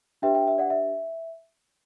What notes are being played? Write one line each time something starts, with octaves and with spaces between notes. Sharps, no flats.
D4 G4 B4 E5 G5
E5 G5
E5
D5 F#5
E5